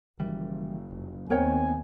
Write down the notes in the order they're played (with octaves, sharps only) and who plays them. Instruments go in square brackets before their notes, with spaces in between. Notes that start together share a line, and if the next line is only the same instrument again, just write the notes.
[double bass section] F#1 [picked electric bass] D#3 E3 G3
[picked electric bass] F1
[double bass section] D#2 [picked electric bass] B3 [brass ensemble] C4 G#5 [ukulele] A#4 C#5 G5